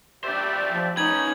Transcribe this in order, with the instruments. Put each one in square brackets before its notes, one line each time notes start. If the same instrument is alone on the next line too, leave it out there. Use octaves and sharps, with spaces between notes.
[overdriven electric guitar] D4 C5 [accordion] G4 D5 E5
[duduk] F3
[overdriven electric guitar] C#4 B4 [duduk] D#4 [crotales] G#6 F#7